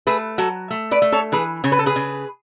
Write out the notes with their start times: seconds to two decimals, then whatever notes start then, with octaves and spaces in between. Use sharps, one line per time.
0.07 A3 G#4 B4
0.38 F#3 F#4 A4
0.70 A3
0.91 B4 D5
1.02 A3
1.12 A4 C#5
1.32 E3 G#4 B4
1.64 C#3 C#5
1.72 B4
1.79 A4
1.86 G#4 B4
1.96 C#3